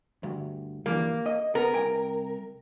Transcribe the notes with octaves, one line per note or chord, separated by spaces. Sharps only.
D2 G2
G2 E3 G3 A#3
D#5
B3 A#4
C2 G5 G#5